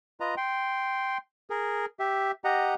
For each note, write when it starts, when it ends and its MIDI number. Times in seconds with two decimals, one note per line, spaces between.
0.20 0.35 65
0.20 0.35 71
0.20 0.35 75
0.20 0.35 82
0.37 1.18 79
0.37 1.18 84
1.50 1.86 68
1.50 1.86 70
1.99 2.31 67
1.99 2.31 76
2.44 2.75 67
2.44 2.75 75
2.44 2.75 78
2.44 2.75 82